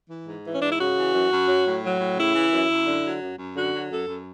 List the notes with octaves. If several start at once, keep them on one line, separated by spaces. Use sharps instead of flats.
E3
G#2
E3
C#4
G#2 D4
E4
C#3 F#4
E3
F#2
F#2
F#3
A2
F#3
A2
C#3 E4
E3
F#2
F#2
D3
F#3
F#2
F#2
D3 F#4
F#3
F#2 A4
F#2